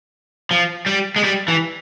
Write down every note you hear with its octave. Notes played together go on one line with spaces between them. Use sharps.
F3
G3
G#3
G3
E3